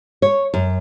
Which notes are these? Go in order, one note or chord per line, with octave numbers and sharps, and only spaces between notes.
C#5
F#2